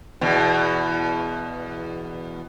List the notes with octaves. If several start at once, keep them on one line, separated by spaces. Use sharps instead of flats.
E2 B2